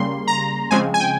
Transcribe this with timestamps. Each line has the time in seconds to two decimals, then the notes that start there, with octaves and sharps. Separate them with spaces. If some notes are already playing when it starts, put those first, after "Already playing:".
Already playing: C#3 G3 A#3 C6
0.27 A#5
0.71 C#3 F3 G#3 C4 G#5
0.94 G#5
1.00 G5